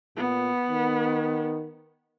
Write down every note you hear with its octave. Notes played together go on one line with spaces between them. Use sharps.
A#2 B3
D#3